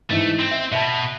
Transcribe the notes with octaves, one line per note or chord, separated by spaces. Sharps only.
G#2 E3 A3
C4
E5
B2 E5 A5